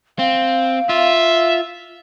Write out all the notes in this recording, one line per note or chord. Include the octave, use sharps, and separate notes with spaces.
C4 F5
F4 E5